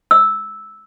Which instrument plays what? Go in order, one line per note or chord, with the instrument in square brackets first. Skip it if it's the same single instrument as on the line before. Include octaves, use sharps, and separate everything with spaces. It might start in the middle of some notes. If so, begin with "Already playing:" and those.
[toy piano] E6